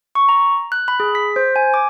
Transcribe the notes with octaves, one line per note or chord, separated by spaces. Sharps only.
C#6
A#5
F#6
B5
G#4
B6
C5
G#5
D6